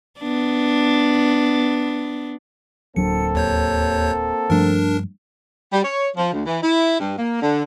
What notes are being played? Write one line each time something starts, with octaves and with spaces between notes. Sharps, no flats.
B3 D4
D1 F#3 A#3 C4 D4 A4 C#7
D#2 C#5 G6
G2 F3 A3 D4 A#4
G3
C#5
F3
D2
E3
E4
G2
A#3
D3